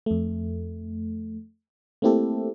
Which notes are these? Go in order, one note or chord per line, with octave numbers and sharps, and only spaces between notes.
F2 A3
A3 A#3 C4 E4 G4 A4